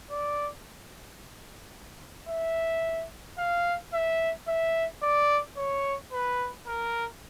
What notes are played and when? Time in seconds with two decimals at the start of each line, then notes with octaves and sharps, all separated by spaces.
0.11 D5
2.29 E5
3.38 F5
3.94 E5
4.48 E5
5.02 D5
5.57 C#5
6.12 B4
6.67 A#4